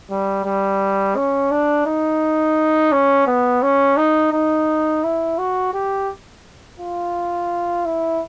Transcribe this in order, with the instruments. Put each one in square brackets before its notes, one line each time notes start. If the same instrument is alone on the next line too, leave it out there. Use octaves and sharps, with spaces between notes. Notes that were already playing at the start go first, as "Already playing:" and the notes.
[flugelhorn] G3
G3
C#4
D4
D#4
C#4
B3
C#4
D#4
D#4
E4
F#4
G4
F4
E4